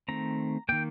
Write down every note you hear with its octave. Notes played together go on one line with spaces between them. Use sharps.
D#3 A3 C4 A#5
D#3 A#3 G5